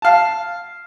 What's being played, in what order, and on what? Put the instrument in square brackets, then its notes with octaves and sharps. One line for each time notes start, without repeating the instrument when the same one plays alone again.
[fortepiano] F5 A5